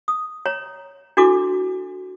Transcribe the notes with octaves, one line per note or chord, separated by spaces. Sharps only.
D#6
C#5 A#5
D4 E4 F#4 A4 D6